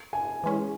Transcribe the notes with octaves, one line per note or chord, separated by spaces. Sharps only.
G#5
E3 G#3 C#4